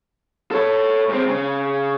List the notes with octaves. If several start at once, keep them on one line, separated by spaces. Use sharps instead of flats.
A4 C#5
G#2 C4
C#3